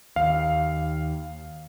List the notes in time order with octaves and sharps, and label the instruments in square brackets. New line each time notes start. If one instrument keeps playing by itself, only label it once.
[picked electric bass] D#2 [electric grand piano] F5